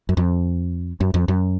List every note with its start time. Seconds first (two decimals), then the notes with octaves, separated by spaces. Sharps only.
0.09 F#2
0.17 F2
1.01 F#2
1.14 F2
1.28 F#2